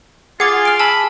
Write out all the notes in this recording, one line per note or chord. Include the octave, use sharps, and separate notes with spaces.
F4 G#4 F#5 D6 A6
F6 D7
G#5 A5 B5 E6